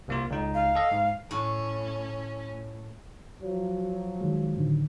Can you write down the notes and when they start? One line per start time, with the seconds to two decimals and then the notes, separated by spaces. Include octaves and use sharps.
0.08 C2 A#3 F4
0.30 C#2 D#4
0.54 F5
0.75 A4 D#5
0.91 G#2
1.31 A2 C#4
3.43 F3 F#3
4.20 D#3 G#3
4.56 A2 D3 D#3